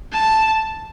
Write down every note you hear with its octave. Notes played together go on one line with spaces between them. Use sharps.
A5